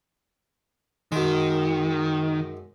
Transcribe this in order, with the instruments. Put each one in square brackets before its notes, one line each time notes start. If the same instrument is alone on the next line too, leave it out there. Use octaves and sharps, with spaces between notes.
[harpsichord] F#2 G#3 [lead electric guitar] D#3